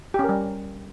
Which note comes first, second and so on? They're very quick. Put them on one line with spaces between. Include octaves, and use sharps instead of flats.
G4 C#4 A#4 G3